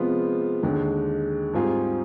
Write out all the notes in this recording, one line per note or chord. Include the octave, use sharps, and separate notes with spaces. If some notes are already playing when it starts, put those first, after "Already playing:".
Already playing: C3 F3 G#3 B3 F4
D#2 D3 G#3
G#2 G3 C4 F4 G#4